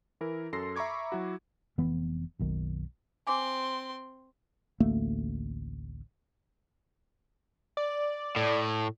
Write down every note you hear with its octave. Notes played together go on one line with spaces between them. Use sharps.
E3 E4 A#4
F#2 A4 C6 A#6 C7
E5 A#5 B5 C#6 D6 G#6
F#3 E4 F#4
F1 E3 B3
F#1 B1 D#3
C4 G#5 C6 D6
A1 D2 A3 A#3
D5
A2